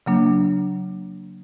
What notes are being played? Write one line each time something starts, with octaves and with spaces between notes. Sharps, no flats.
C#3 F#3 A#3 D4